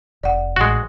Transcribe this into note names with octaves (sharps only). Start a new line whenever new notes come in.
F1 D5 F#5
A1 G#3 F#4